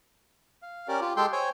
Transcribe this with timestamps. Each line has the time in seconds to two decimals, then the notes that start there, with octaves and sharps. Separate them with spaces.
0.62 F5
0.88 C#4 G4 A#4 D5
1.01 F4 G4
1.17 G#3 G4 A4 G5 C6
1.32 C5 C#5 G5 G#5